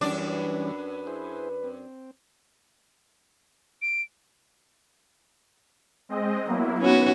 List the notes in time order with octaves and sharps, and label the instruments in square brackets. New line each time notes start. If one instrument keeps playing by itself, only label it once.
[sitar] F#2 D4 D5 [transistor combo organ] E3 G3 C#4
[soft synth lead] B4
[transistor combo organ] E4 G#4 C5
C4
[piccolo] D7
[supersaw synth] G#3 C4 D#5
[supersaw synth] F#3 A#3 E4 [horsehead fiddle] B3
[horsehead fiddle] B3 D#4 [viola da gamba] C#4 F#4 [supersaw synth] B4